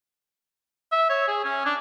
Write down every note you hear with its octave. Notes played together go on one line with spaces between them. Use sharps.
E5
C#5
G#4
C#4
D4